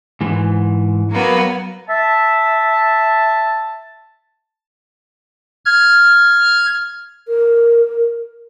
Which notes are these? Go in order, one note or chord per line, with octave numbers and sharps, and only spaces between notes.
G#2 E3
F#3 A#3 B3
E5 A5
F6 G#6
A#4